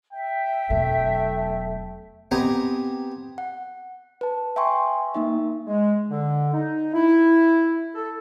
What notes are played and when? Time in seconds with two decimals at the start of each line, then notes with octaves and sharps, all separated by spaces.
0.13 E5 G5
0.70 E1 F#3 A3
2.31 B3 C4 G4 D#5 G#5 A#5
3.38 F#5
4.21 B4 A5
4.56 E5 G5 G#5 C6 C#6
5.14 A#3 D#4 E5
5.67 G#3
6.09 D3
6.53 D#4
6.94 E4
7.95 A4